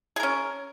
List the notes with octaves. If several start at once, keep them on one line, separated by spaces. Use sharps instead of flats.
C#4 G#4 A#4